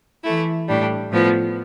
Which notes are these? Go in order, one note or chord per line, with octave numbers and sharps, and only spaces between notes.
E3 A3 E4
A2 G3 D4
A2 F3 B3